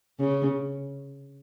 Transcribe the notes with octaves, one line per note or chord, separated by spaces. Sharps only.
C#3